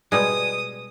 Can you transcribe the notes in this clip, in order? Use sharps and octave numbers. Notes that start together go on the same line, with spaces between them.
B2 G3 G#3 D#6